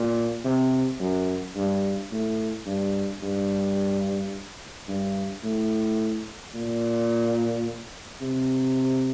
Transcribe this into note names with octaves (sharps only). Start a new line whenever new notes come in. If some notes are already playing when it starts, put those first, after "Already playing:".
Already playing: A#2
C3
F#2
G2
A2
G2
G2
G2
A2
A#2
C3